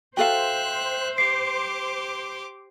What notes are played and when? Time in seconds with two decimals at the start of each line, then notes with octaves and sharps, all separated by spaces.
0.17 F#4 A4 C5 E5 F5 G5 F#6
1.18 G4 D6 C7